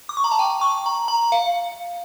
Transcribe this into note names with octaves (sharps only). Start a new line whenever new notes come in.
D6
C#6
A#5
A5
G5
C#6
A#5
A#5
F5